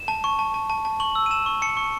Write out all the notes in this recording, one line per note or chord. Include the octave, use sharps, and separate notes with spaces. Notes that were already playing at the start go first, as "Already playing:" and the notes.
Already playing: E7
A5
C#6
A5
A5
A5
A5
C#6 F#7
E6
D#7
A5 E7
C#6
A5 C#7
C#6